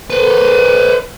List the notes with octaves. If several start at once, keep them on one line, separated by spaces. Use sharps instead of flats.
B4 C5